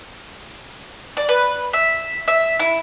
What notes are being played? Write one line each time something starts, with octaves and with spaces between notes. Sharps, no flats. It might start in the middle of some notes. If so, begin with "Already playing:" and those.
D5
B4
E5
E5
E4